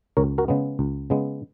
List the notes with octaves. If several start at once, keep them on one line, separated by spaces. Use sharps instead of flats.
C#2 A#4 C#5
F#4 A#4
C#3 G#3 B3
C#2
C#3 G#3 B3